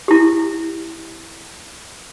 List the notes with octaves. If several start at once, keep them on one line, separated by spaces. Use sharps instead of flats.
E4 G4